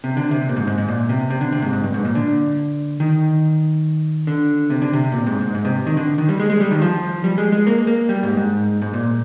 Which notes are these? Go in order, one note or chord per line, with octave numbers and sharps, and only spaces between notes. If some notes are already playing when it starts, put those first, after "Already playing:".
C3
D3
C3
A#2
G#2
G#2
G#2
A#2
C3
C3
D3
C3
G#2
G#2
G2
G#2
A#2
D3
D#3
D3
C3
D3
C3
A#2
G#2
G#2
G#2
C3
D#3
D3
D#3
G3
G#3
G#3
G3
D#3
F3
G3
G#3
G#3
A#3
A#3
G3
G#2
G#2
G#2
A#2